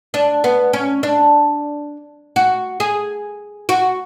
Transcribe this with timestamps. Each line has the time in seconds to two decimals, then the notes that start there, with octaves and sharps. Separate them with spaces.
0.14 D4
0.44 B3
0.73 C#4
1.03 D4
2.36 F#4
2.80 G#4
3.69 F#4